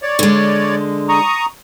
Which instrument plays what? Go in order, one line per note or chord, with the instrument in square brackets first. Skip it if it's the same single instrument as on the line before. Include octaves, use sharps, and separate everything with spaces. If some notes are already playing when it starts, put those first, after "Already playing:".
[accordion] C#5 D5
[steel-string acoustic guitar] D3 G#3
[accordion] A#5 C#6 D#6